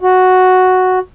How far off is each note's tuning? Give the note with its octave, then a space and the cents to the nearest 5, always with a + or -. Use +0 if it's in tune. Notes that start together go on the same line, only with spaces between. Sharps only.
F#4 +0